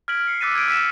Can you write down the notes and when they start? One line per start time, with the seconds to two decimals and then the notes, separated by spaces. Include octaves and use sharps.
0.08 F6 G#6 B6 D7 F#7
0.27 C7 C#7
0.41 D6 E6 F#6 A6 B6 D#7
0.55 G#6 D7
0.68 E6 B6 E7